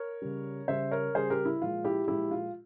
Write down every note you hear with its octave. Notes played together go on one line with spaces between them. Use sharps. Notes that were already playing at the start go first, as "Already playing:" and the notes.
Already playing: A#4 C#5
C#3 G3
C#3 G3 C5 E5
A#4 C#5
C#3 G3 G#4 C5
G4 A#4
E4
A#2 F3 G#3 F4
E4 G4
A#2 F3 G#3 E4 G4
F4